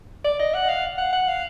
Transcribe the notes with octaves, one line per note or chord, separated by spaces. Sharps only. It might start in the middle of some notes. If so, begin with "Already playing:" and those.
D5
D#5
F#5
F5
F#5
F#5
F5